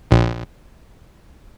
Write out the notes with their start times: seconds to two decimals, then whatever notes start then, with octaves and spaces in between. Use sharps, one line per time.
0.11 A#1